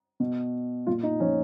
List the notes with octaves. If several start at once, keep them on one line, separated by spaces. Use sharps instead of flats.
B2
A#2 F4
D#4
F3 C#4